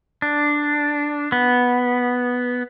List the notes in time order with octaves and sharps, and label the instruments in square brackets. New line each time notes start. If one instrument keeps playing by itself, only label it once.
[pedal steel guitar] D4
B3